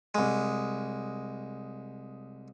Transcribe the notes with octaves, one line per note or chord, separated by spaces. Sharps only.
C2 G#3